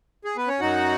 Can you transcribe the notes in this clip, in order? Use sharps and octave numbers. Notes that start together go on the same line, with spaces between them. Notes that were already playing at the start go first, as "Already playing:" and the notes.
G#4
B3 B4
C#4 C#5
F#2 F#3 D#4 F#4 F#5